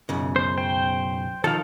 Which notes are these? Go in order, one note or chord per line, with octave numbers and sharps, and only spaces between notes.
B1 F#2 C#3
C5
C5 G5
D#3 F3 A4 F5